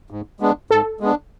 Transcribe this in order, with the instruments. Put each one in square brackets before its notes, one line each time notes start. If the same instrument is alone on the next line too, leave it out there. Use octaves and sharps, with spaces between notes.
[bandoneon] G#2
G#3 B3 D4
[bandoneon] G#2 [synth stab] A4
[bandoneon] G#3 B3 D4